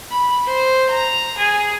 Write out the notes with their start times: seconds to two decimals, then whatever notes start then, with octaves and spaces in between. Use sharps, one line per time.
0.10 B5
0.46 C5
0.90 A#5
1.38 G#4